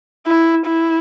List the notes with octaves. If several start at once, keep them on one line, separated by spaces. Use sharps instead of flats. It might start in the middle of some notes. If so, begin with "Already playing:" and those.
E4
E4